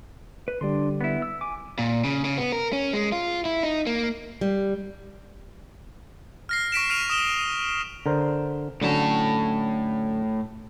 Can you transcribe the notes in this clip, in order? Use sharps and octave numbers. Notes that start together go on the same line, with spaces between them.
B4
D3 G3 D4 C6
B3 E4
E6
G#5 D6
A#2
C#3
C#3
B3
A#4
C#4
G#3
F4
E4
D#4
A#3
G3
F6 A#6 C7
C#6 B6 D7 E7
F6 C7 D7 D#7 F7
D#6 E7 G7
D3 A#4 C5
A2 D3 F#3 C#4 A5